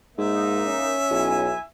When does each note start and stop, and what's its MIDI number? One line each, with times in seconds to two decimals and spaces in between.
0.18 0.75 44
0.18 0.96 58
0.18 0.96 63
0.18 1.64 76
0.66 1.49 61
1.11 1.52 35
1.11 1.61 64
1.11 1.61 80